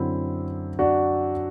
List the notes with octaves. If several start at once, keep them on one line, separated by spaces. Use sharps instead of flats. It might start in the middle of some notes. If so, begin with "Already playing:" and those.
Already playing: F#2 D3 C4 E4
D4 F#4